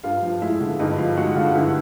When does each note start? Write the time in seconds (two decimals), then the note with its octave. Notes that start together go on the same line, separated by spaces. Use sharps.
0.04 G2 F4 F5
0.22 F3
0.42 G#3 E4 E5
0.61 D3
0.79 G2 D#4 D#5
0.98 F3 F4 F5
1.17 G#3 F#4 F#5
1.36 D3 F4 F5
1.54 G2 E4 E5